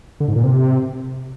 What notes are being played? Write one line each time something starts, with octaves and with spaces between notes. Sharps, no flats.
D3
G#2
A#2
C3